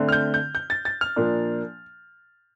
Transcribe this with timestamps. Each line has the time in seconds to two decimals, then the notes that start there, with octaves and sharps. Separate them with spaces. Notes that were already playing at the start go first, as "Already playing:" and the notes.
Already playing: D3 A3 C4
0.09 F6
0.12 G6
0.34 G6
0.55 G6
0.70 A6
0.85 A6
1.01 F6
1.16 A#2 F3 A#3 D4